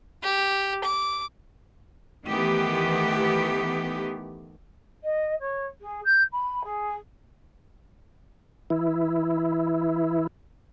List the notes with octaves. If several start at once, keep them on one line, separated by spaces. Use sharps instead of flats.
G4
D6
D#3 E3 A3 B3 G4
D#5
C#5
G#4
G6
B5
G#4
E3 E4